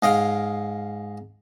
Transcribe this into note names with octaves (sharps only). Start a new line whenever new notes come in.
G#2 D#5 F5 G5